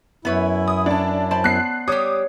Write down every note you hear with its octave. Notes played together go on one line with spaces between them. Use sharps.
F#2 B3 E4 B4 C#5
D#6
C#4 D4 D5 A5
C5 D5 A5 B5
B3 F#6 C7
G3 G4 C#5 D6 D#6